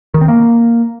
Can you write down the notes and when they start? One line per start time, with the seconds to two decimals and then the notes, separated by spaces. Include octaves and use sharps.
0.14 D#3
0.21 C4
0.28 A#3